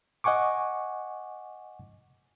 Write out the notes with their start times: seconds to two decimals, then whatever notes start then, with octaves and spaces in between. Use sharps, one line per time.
0.24 D#5 F#5 G#5 C#6 D6